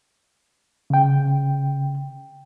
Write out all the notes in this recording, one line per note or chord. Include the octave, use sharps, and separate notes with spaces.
C#3 G5